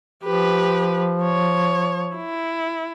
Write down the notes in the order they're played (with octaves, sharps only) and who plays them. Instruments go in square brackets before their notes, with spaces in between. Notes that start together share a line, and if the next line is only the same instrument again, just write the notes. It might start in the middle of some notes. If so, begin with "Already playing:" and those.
[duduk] F3 [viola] G4 B4
[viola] C#5
E4